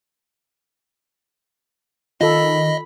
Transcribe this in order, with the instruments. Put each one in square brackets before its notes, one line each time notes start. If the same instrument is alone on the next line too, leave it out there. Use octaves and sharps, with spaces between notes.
[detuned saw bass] D#3 [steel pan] F4 A4 [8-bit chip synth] D#5 [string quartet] B5